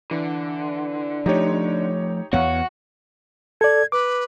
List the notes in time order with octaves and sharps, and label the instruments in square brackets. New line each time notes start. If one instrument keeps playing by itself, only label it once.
[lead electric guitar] D3 [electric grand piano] E3
[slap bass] F3 A3 [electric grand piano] D#4 G4 C#5
[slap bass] E2 B3 [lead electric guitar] F#4 [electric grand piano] C#5 F5 F#5
[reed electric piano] A4 D5 [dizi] G#6
[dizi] B4 [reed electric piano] D6